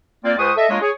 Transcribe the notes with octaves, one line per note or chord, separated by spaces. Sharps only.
A#3 C4 F4 D5
C#2 G#4 B4 C5 C#6 D#6
A4 D#5 E5
G#3 A#3 D4 F4 C#5 D#5
G#4 C#5